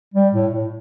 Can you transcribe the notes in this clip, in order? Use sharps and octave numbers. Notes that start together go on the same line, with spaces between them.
G3
A2
A2